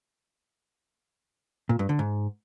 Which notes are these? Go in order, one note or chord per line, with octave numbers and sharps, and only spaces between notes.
A#2
G2
D3
G#2